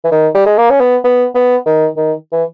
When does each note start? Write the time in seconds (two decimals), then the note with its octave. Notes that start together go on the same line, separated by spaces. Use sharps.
0.04 E3
0.12 D#3
0.35 G3
0.46 G#3
0.58 A#3
0.70 C#4
0.80 B3
1.04 B3
1.35 B3
1.66 D#3
1.97 D#3
2.32 E3